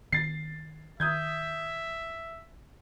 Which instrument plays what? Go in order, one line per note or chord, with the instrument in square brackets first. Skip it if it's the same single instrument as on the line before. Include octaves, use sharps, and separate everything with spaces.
[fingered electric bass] D#3 B3 [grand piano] A6 C7
[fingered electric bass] D#3 [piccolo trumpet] E5 [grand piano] D#6 G6 G#6